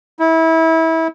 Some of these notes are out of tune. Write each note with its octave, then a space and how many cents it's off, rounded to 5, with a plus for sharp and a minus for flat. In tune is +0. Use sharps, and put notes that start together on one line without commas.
E4 -25